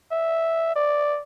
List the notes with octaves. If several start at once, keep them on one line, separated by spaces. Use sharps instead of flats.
E5
D5